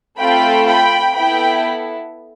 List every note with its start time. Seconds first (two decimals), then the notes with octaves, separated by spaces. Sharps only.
0.18 A3 C4 F4 A4 G5 B5
0.66 G5 B5
1.15 B3 E4 A4 G5 B5